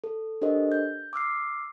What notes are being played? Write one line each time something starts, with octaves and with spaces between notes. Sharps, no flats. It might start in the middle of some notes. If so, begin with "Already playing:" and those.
A4
D4 G4 A4 A#4 C5 D#5
G6
D6 E6 F6 C7